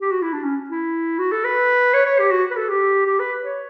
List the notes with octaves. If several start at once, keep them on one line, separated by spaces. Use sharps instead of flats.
G4
F#4
E4
D4
C#4
E4
F#4
A4
B4
C#5
C#5
G4
F#4
B4
A4
G4
G4
B4
C#5